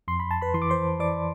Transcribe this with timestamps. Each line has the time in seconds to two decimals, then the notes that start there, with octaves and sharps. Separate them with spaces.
0.08 F2 C6
0.20 B5
0.31 A5
0.41 B4 B5
0.54 E3 C6
0.62 D6
0.70 C5 C6
0.99 E3 D5 D6